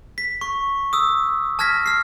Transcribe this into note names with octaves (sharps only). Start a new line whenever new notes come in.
B6
C#6
D#6 E6
A5 F6 G#6 A#6 B6
F6 C7